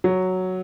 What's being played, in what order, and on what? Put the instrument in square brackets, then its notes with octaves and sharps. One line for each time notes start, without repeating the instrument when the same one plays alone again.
[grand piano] F#3